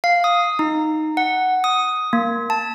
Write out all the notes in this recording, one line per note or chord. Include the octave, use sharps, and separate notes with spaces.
F5
D#6
D#4
F#5
D#6
A#3
A5